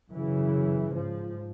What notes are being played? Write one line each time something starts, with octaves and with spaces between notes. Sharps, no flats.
F#2 C#3 E3
G#2 F3